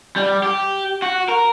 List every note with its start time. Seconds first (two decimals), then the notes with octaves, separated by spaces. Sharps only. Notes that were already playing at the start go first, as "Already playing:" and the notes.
0.16 G3
0.43 G4
1.02 F#4
1.28 A#4